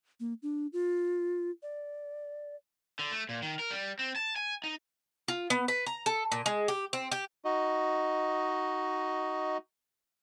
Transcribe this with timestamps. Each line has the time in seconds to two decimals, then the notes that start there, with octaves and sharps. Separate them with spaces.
0.20 A#3
0.43 D4
0.73 F4
1.63 D5
2.99 D3
3.11 A3
3.29 A#2
3.42 D#3
3.59 A#4
3.71 G3
3.99 C4
4.16 A5
4.36 G#5
4.64 D#4
5.28 F4
5.50 B3
5.68 B4
5.86 A#5
6.06 A4
6.32 A#2
6.46 G#3
6.68 G4
6.93 C4
7.12 G4
7.45 D#4 F#4 D#5